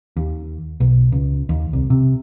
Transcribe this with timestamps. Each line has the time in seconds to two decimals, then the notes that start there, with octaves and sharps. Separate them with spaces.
0.17 D#2
0.80 B1
1.12 C#2
1.49 D#2
1.73 C2
1.90 C3